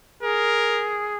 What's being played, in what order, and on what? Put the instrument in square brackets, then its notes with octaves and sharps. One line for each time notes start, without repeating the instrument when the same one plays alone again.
[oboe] G#4 [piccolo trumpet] A#4